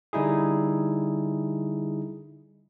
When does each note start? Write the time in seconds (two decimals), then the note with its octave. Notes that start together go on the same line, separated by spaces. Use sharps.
0.13 D3 G3 D#4 E4 G#4